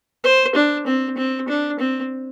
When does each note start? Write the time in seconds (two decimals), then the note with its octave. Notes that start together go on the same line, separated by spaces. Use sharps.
0.24 C5
0.55 D4
0.87 C4
1.17 C4
1.48 D4
1.80 C4